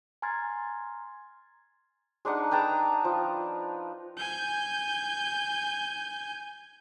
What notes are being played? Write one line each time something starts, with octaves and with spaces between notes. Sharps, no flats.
G#5 A#5 C6 F6 G#6 A6
G#3 D4 D#4 F#5
B4 G5 A5 A#5
F3
G#5 G6